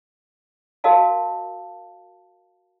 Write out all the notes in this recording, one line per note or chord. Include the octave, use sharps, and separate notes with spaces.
F#4 A#4 D#5 F5 A5